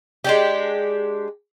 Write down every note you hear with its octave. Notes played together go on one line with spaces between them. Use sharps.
G#3 D4 G4